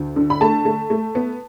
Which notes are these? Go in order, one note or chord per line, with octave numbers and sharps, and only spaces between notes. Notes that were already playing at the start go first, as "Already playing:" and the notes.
Already playing: D2
D3
B5
A3 A5
A3
A3
B3